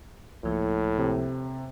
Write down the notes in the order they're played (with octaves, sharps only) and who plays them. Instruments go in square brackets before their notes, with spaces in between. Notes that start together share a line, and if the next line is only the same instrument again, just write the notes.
[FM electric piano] C#2 F3 A#3 [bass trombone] A2
[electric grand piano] C3